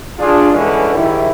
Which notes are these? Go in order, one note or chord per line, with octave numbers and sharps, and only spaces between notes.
D4 F4 G#4
G2 D3 E3 G#3 C#4 B4
G#2 D#3 G3 G#3 E4